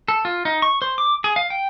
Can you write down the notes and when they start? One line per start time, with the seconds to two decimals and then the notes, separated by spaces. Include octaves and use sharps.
0.08 A4
0.25 F4
0.45 D#4
0.62 C#6
0.82 C5
0.98 D6
1.24 G#4
1.36 F5
1.50 G5